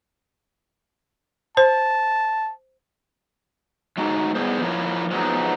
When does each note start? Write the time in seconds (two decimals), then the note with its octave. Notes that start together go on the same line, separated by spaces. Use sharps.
1.57 C5 A5
3.97 F#3 G#3 D#4 F#4
4.35 G3 B3 E4 G#4 C5
4.62 F3 E4 A#4 C#5
5.11 F3 F#3 G#3 B3 D#4